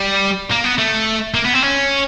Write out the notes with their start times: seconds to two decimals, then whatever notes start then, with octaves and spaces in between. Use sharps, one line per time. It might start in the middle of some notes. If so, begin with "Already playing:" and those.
Already playing: G3
0.51 A#3
0.64 B3
0.78 A3
1.34 A#3
1.45 B3
1.54 C4
1.62 C#4